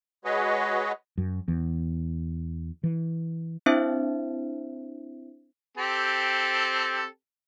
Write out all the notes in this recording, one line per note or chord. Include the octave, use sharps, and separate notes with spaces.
G#3 F#4 G#4 B4 C#5 D#5
F#2
E2
E3
C4 D4 E4 C5 E5
C4 G4 A4